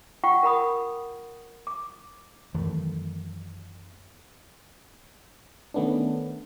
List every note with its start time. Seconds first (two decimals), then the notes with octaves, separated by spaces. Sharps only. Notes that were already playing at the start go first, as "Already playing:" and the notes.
0.24 F4 F#5 G5 C#6
0.43 A#4 F#5 B5 D#6
1.67 D6
2.54 F#2 D#3 E3 A3
5.74 D#3 A3 B3 C#4 D4